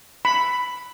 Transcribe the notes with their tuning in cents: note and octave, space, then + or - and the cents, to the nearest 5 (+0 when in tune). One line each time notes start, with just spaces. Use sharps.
B5 +5